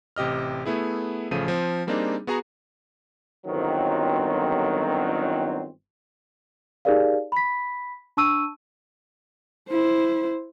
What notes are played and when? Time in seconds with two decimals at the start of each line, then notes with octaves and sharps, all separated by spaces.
0.16 A1 C3 G4 D#5 F6
0.66 A3 B3 E4 G#4
1.31 A1 C#3 F3 A3 F5 D#7
1.48 F3 C4
1.87 G3 A#3 C4 D4 D#4 G#4
2.27 B3 F#4 G#4 F#5 A#5
3.47 G1 D#3 F#3 C4
6.85 D#4 G4 G#4 A#4 D5 F5
7.32 B5 B6
8.17 D4 A5 C#6 E6 D#7
9.69 E4 C5